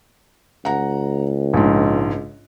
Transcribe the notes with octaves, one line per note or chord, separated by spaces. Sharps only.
C#2 F#5 A#5
A#1 G#2